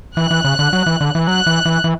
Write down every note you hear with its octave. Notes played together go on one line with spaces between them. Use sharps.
E3 F#6
E3
C#3
D3
F#3
E3
D3
E3
F#3 F#6
E3
E3
E3